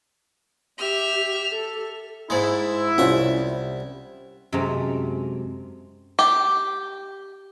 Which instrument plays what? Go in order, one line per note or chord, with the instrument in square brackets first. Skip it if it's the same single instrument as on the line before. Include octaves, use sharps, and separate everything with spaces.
[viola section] G4 [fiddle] E5 F6
[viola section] A4
[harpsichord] G#2 G#3 [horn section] E4
[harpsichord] C2 E5 F#5 [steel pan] C#4 F4 C#5
[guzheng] F#2 C3 G#3 A3 C4 A#5
[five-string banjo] G4